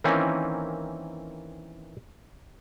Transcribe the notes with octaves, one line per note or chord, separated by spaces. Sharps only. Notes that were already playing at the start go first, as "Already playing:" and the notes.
D#3 E3 A#3 C4 C#4